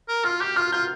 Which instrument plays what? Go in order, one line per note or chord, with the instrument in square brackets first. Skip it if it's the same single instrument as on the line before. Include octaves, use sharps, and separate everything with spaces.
[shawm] A#4
[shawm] F4 [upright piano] F6
[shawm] G4 [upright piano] G6
[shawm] F4 [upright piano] F6
[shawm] F4 [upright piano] G6